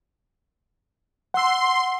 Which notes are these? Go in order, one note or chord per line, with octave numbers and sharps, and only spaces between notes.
F#5 C6 E6